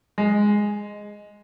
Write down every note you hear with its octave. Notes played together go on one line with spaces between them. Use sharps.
G#3